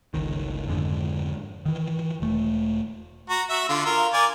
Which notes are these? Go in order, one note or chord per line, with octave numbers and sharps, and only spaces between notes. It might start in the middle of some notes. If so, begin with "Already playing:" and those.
G1 C#2 D#3
F2 G#2 D3
D#3 E3
E1 A3
F#4 A#5
F#4 E5
D3 F4
F4 A#4
A#4 D5 G#5